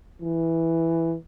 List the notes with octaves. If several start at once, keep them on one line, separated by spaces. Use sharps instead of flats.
E3